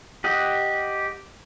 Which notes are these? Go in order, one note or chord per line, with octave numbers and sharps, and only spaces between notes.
G4 D#5 F#5